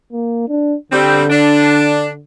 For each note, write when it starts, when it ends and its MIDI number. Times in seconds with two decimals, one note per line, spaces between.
0.13 0.47 58
0.48 0.75 62
0.92 2.23 50
0.92 1.24 55
0.92 1.24 60
1.30 2.09 62